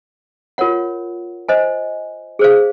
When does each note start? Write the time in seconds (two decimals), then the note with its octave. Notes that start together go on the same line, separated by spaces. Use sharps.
0.58 F4 A#4 C#5 F#5
1.49 C5 D#5 G#5
2.39 G#4 C5 F5